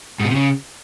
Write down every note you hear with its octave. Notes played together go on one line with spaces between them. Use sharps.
G#2
B2
C3
C#3